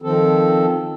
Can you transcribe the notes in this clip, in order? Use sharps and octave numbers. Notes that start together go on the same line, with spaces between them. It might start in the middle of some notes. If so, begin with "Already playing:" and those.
D#3 F3 C4 A4